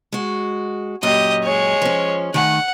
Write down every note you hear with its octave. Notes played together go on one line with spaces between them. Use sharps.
G#3 F#4
F#2 A#2 G4 D#5
G#3 C#5
F3 C#4
D#3 A3 F#5 G#5